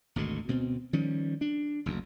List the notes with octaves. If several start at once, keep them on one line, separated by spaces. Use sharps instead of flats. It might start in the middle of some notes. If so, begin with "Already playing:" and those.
G#1 D2 B2 D3
D2 B2 A#3 C4
D#3 F3 G3 C#4
D4
F#1 D2